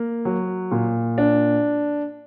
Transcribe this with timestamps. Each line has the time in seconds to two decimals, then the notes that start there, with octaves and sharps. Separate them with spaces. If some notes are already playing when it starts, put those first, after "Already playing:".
Already playing: A#3
0.25 F#3
0.71 A#2
1.18 D4